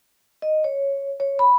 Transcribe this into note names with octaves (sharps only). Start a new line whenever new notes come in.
D#5
C#5
C#5
B5